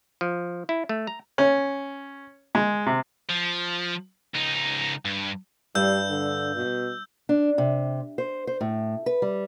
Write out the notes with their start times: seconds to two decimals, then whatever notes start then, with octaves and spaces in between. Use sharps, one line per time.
0.21 F3
0.69 E4
0.89 A3
1.07 A#5
1.38 C#4
2.55 G#3
2.86 C3
3.29 F3
4.35 C#2 D#4
5.05 G2
5.75 G2 G3 E6 G6
6.10 D3
6.56 B2
7.29 D4
7.58 C3
8.18 C5
8.47 C5
8.61 A2
9.06 B4
9.22 G3